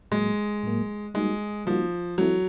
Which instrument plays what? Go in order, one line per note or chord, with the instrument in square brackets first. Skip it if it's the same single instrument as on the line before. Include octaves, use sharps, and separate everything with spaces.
[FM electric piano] A2 F#3 A#3 [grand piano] G#3
[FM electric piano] A2 F#3 A#3
[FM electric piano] G3 A#3 D#4 F#4 [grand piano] G#3
[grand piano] F3 [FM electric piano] G3 A#3 D#4 F#4
[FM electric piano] E3 G#3 C4 E4 A4 [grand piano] F#3